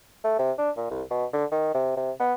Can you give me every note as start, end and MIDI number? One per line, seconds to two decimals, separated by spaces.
0.24 0.36 57
0.39 0.52 48
0.58 0.70 62
0.77 0.90 46
0.90 1.03 36
1.10 1.25 47
1.33 1.45 50
1.52 1.72 51
1.74 1.95 48
1.97 2.11 48
2.20 2.34 59